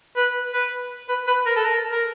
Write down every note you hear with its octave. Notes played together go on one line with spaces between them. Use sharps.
B4
B4
B4
B4
A#4
A4
A#4
A#4